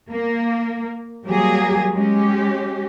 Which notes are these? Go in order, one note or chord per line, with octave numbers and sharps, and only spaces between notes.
A#3
F#3 G3 A#3 G4 G#4
G#3 C#4 G4